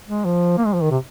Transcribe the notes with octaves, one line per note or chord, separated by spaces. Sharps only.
G#3
F3
A#3
G#3
F3
D#3
C3